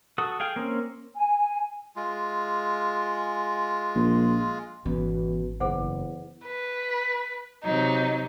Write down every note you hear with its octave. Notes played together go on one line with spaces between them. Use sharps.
F#4 A4 D#6
G#4 F5 G5
A#3 C4 C#4
G#5
G#3 F4
A#1
G#1 B2 E3 B3 C#4
F#1 E2 G#4 C5 F#5
B4
C3 F#3 D#4